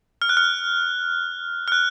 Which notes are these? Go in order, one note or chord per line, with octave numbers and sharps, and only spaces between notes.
F6
F#6
F6
F6
F#6